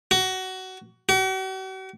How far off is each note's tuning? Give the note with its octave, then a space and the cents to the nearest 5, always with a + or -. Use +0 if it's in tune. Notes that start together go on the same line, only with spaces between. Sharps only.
F#4 +20
F#4 +45